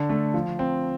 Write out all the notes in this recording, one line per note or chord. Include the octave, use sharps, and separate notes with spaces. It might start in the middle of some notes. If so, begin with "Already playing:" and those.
Already playing: D3
A3
F3
C4